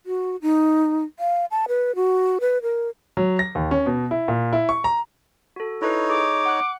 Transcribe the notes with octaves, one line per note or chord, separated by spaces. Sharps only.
F#4
D#4
F5
A5
B4
F#4
B4
A#4
F#3
A#6
D#2
C#4
B2
E4
A#2
E4
C#6
A#5
F#4 A4
D#4 E4 A4 B4 C#5
G#4 D6
F#5 F#6